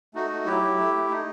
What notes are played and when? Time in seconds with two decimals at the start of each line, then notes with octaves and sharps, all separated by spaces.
0.14 A3 D#4 F#4
0.31 A3
0.46 F#3 E4 G4
0.62 F#3
0.78 A3
0.94 A3
1.10 A3 D#4